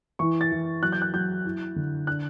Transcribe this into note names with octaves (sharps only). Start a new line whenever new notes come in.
E3 C#6
A6
E3
F#3 F#6
G6
F#6
F#3 G6
E4
D3
D4 F#6